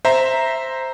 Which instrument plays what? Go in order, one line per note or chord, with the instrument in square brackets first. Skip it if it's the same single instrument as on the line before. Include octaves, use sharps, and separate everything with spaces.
[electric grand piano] C5 E5 A#5